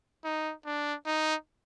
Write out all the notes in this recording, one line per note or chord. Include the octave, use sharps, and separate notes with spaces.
D#4
D4
D#4